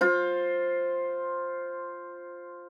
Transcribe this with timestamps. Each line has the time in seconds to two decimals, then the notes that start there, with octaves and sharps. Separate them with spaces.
0.01 F4 C5